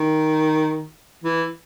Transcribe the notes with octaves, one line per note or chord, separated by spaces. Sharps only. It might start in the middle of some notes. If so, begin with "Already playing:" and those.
Already playing: D#3
E3